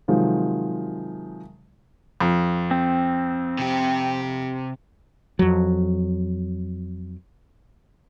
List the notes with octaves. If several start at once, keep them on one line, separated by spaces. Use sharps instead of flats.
C3 D#3 F3 F#3 G#3
F2
C4
C3 G4
F2 F#3